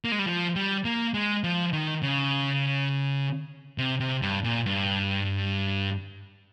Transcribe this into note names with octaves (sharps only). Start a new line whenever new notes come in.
A#3
G#3
G3
F3
G3
A#3
G#3
F3
D#3
C#3
C3
C3
G2
A#2
G2